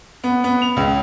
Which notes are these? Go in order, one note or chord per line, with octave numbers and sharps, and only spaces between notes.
B3
B3
F7
C#2